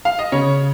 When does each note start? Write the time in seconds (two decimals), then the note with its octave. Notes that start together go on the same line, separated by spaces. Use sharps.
0.05 F5
0.19 D#5
0.32 C#3 C#5